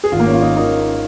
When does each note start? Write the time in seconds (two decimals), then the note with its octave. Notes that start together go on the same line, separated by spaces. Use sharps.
0.04 G#4
0.12 G#1 F4
0.20 A#3
0.27 C#4
0.34 F4
0.42 D#4
0.56 D#3 D#4